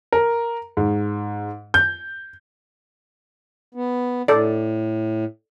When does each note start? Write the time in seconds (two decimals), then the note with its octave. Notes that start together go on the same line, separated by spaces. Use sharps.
0.12 A#4
0.77 G#2
1.74 G6
3.75 B3
4.28 A2 A4 D5